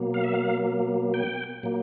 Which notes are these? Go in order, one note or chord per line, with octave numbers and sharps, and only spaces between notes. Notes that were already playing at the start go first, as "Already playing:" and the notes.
Already playing: B2 F#3 A#3
F5
E5
F5
G5
A#2 F#3 A#3